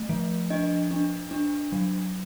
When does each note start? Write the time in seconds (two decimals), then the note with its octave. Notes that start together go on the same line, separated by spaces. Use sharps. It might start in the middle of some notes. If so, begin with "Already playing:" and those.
Already playing: A3
0.09 F3
0.50 D4 D#5
0.91 D4
1.31 D4
1.72 F#3